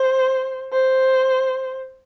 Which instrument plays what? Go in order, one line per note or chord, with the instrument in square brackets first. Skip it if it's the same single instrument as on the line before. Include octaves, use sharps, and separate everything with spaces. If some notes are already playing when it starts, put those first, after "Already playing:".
Already playing: [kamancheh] C5
C5